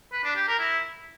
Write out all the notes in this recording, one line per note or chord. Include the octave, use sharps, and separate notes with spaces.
B4
D4
G4
A#4
E4